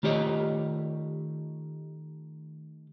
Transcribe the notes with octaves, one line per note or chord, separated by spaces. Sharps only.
D#3 A3 F4 G4 C#5 D#5